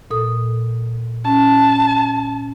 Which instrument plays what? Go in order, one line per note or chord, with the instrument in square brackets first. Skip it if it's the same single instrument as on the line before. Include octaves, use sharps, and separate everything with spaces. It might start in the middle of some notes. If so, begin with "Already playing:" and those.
[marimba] A#2 A4 D#6
[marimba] C#4 [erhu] A5